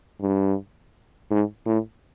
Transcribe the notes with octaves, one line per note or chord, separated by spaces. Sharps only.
G2
G#2
A2